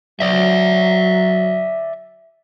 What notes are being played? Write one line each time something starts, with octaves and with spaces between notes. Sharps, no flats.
F#3 D5 E5